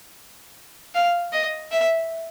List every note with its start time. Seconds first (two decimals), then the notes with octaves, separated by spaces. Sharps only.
0.94 F5
1.33 D#5
1.71 E5